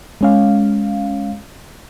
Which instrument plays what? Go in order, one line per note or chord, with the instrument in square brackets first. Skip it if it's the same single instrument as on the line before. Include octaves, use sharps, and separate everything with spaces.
[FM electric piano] G#3 C#4 F5